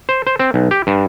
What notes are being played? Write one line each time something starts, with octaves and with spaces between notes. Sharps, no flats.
C5
C5
C4
B1
G4
G2